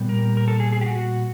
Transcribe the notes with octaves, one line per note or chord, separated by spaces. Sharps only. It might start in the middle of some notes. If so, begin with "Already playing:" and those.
Already playing: A#2 G3 B3
A#4
A#4
A4
G#4
G#4
G4
F#4